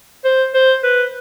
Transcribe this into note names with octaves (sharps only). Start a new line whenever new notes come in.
C5
C5
B4